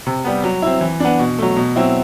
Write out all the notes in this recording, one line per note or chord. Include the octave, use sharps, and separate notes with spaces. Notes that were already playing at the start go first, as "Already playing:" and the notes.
C3
G3 B3
F#3
C4 E4
E3
B3 D4
B2
F#3 A3
B2
F#3 C4 E4